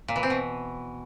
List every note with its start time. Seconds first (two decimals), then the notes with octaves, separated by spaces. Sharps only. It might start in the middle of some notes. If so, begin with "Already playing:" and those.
0.08 A#2
0.16 E3
0.23 C4
0.30 B2